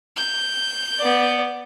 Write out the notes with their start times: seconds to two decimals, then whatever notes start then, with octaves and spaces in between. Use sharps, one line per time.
0.17 G6
0.98 B3 D5